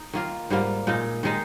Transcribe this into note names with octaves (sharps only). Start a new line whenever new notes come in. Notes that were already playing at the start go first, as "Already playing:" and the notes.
Already playing: D#4
D#3 A#3 F4
G#2 G3 A#3 F4
A#2 G#3 D#4
D#3 G#3 D#4